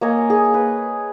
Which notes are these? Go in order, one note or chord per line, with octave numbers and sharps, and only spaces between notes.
A#3 C#5 D#5 G#5
G#4
B4